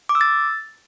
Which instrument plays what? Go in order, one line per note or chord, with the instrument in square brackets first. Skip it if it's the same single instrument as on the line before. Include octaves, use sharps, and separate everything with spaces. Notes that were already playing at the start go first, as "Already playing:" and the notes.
[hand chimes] D6
E6
A6